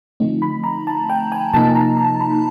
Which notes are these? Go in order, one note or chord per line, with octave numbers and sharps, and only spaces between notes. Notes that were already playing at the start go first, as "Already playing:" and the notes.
D3 F3 A3 C4 D#4
B5
A#5
A5
G5
G#5
C3 F3 A#3 D#4 A5
A#5
A#5
B5